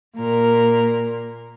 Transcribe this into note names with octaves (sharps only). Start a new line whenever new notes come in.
A#2 A#4